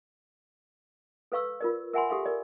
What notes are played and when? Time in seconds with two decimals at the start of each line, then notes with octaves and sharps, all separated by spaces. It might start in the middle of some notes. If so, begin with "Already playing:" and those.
1.32 A4 B4 F5 C#6 E6
1.61 F4 A#4 D5
1.93 A#4 E5 F#5 G#5 B5 C6
2.10 G4 A4 E5 F5 C6
2.26 A#4 D5